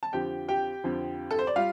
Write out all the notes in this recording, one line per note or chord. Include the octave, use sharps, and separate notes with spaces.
A5
F2 D3 F3 G4 G5
G4 G5
F2 D3 F3
A4
C5
D5
G3 F4 F5